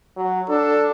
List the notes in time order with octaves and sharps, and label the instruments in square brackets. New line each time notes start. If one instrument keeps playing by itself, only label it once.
[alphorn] F#3
[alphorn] D4 [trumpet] A4